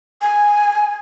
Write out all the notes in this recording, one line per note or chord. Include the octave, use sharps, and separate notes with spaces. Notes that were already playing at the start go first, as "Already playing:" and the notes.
G#5